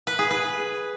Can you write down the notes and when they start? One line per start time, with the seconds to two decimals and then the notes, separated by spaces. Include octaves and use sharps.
0.07 B4
0.19 G#4
0.30 B4